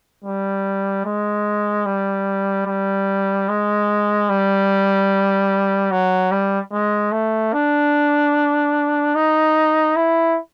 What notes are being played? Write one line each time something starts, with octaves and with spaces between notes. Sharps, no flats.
G3
G#3
G3
G3
G#3
G3
F#3
G3
G#3
A3
D4
D#4
E4